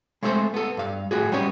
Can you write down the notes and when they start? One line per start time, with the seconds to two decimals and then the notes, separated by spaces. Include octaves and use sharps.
0.23 G#3 A3 C4 A4 C5
0.54 B3 A4
0.77 G2 F5
1.11 A2 F#4 G#4
1.32 G3 B3 C#4 C#5